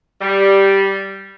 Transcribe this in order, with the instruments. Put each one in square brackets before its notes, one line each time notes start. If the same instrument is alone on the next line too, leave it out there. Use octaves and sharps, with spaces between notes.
[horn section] G3